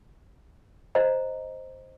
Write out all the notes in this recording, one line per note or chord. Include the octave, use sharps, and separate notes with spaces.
C5 D#5 A#5